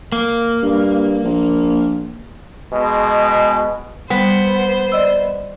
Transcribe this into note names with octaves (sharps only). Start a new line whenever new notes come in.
A#3
G2
A#1
B2 G#3
G3 B3 C5
D5 D#5 E6